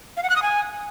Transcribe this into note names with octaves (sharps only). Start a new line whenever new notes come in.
F5
F#5
F#6
D#6
G#5